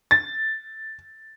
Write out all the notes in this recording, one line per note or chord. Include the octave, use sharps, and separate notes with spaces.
A6